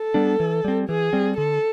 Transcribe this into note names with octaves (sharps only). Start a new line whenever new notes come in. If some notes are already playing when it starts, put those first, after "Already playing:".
Already playing: A4
G3 B3 D4
E3
G3 C4
E3 G#4
G3 C4
D3 A4